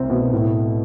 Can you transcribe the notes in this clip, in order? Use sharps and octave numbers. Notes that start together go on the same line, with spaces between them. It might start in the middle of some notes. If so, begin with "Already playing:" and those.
Already playing: C2 C4
B2
A2